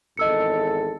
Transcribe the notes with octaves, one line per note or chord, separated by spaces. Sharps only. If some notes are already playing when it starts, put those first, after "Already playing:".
G#1 E2 A4 D#5 E6 C#7